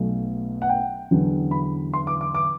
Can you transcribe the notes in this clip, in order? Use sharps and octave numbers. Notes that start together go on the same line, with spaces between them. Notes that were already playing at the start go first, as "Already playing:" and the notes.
Already playing: B1 B2 F#3 A3
F#5
G5
E2 D3 F#3
B5
C6
D6
D6
D6